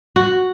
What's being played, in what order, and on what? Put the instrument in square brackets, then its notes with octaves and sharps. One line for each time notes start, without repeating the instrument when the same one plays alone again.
[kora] F#4